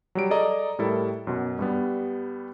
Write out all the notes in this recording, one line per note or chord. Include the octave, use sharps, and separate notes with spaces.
F#3 G3 D7
G#4 A4 D5 D#5 A#5
A2 G3 E4 A4 A#4
F#2 B2
G2 G3 B3